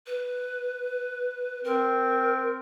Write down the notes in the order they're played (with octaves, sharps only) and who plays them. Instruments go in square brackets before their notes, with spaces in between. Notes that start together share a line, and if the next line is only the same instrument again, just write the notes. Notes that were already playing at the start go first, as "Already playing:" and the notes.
[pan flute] B4
[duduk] C4 [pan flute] A#4